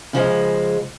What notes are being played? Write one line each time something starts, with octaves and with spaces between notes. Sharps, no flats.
C#3 F3 G#3